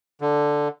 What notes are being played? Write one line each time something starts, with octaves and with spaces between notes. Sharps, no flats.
D3